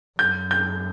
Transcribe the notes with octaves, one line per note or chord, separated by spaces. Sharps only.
F#2 G6
G6